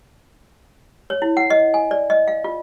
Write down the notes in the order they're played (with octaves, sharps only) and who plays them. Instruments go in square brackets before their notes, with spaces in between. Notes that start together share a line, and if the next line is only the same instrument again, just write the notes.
[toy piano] C#5
E4
F#5
D#5
G#5
D5
D#5
F5
F4